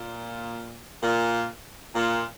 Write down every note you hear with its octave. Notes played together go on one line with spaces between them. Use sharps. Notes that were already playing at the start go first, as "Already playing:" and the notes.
Already playing: A#2
A#2
A#2